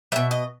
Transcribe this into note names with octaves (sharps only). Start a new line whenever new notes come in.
B2 G3 E5
D#5